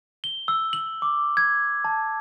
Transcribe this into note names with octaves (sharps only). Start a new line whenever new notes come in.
G7
E6
F#7
D6
G#6
A5